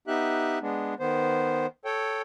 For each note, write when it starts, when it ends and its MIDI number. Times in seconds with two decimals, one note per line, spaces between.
0.07 0.59 59
0.07 0.59 63
0.07 0.59 67
0.07 0.59 76
0.07 0.59 90
0.61 0.94 56
0.61 0.94 59
0.61 0.94 62
1.00 1.67 51
1.00 1.67 59
1.00 1.67 72
1.85 2.22 69
1.85 2.22 73
1.85 2.22 79